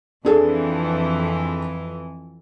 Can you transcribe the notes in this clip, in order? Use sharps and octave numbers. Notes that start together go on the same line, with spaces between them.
F2 E3 D4 G#4 A4